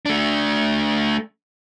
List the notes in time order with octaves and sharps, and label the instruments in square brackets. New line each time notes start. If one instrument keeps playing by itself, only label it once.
[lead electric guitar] A3 D4